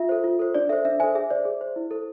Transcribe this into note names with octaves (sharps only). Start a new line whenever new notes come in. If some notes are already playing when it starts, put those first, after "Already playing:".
Already playing: F4 E5
A4 C5
F4
A4 C5
D4 D5
A4 C5 E5
D4 E5
A4 C5 E5 G#5
G#4 E5
C5 D5
G#4
C5
E4
A4 C5